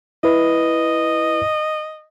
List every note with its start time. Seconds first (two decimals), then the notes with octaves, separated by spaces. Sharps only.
0.24 E4 B4 D#5